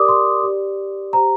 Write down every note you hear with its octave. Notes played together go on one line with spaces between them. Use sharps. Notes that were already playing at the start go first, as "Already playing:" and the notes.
Already playing: G4 A#4 D5 D6 D#6
C6
G4 D5
G4 C5 A#5